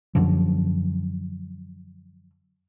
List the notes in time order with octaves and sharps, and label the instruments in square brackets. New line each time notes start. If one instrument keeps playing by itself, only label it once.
[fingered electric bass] F#2 D3 F3 F#3